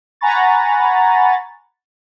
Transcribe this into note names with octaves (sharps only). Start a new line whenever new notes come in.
F#5 G#5 A#5 B5 C#6 A6